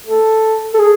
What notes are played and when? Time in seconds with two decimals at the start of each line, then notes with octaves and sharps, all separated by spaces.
0.07 A4
0.74 A4
0.79 G#4